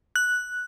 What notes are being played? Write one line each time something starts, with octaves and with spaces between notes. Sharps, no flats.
F#6